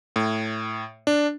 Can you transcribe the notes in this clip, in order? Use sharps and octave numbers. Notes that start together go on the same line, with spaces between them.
A2
D4